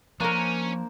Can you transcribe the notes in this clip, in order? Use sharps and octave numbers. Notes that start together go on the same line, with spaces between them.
F3 A#3 C#4 D4 A#4 C5